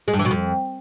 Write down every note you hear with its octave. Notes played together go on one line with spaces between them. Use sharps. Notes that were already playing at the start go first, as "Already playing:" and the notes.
G#3
G2
E3
B2
F2